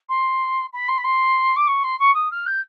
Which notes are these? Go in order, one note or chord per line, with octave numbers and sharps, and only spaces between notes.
C6
B5
C6
B5
C6
D6
C#6
C6
C#6
D#6
F6
G6